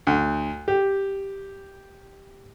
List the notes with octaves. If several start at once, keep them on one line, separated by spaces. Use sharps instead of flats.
D2
G4